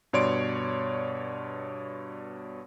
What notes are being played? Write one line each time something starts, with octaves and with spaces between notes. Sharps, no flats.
G2 B2 C#5 D5 C6 D7